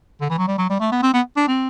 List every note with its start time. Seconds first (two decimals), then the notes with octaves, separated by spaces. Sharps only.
0.21 D3
0.30 E3
0.38 F#3
0.48 G3
0.58 F#3
0.70 G3
0.80 A3
0.92 B3
1.02 C4
1.13 B3
1.36 D4
1.48 C4